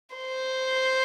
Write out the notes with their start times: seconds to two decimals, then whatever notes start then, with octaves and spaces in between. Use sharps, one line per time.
0.16 C5